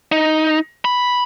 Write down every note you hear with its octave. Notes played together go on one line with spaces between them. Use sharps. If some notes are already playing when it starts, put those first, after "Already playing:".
D#4
B5